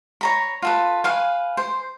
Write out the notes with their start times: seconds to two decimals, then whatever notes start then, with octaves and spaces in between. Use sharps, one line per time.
0.21 C#5 A#5 B5
0.62 F4 A4 B4
1.04 B4 F5 G#5
1.57 C5